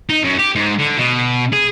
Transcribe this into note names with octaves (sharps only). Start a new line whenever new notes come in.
D#4
F#2
G4
G#2
D3
B2
G#4